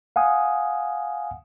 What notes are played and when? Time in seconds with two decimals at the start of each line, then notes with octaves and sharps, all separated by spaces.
0.16 F5 F#5 G#5 D#6